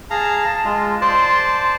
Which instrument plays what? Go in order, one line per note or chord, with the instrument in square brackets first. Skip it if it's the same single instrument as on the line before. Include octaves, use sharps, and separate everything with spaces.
[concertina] G#4 F5 A#5 [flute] A5
[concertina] G#3 F4
[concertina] C5 D5 A5 [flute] C6